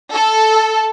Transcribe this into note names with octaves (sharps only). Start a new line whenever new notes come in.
A4